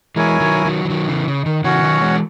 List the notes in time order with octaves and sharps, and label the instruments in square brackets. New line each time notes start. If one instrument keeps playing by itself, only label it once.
[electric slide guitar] E3 G#3 [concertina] E4 A#4 C#5 G#5
[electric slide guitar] D#3 F#3
D#3 F#3
E3
D#3 F#3
C#3 E3
C#3
D#3
[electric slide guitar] C#3 E3 [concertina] C#4 F#4 C#5 F#5
[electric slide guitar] D#3 F#3
E3 G#3